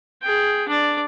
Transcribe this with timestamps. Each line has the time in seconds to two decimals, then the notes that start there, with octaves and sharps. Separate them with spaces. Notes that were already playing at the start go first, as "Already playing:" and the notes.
0.22 G#4 G5
0.69 D4 D5